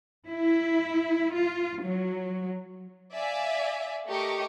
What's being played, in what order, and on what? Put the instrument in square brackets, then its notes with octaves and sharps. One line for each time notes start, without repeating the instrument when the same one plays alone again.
[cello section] E4
F4
F#3
[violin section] D5 E5 F5 G#5
A3 G4 A#4 D#5 C#6 D6